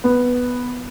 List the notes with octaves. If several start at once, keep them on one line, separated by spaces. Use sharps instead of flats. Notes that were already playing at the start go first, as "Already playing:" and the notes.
B3